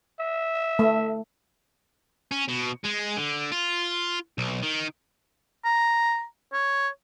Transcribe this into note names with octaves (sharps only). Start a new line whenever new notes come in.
E5
A3
C#4
B2
G#3
D3
F4
B1
D#3
A#5
C#5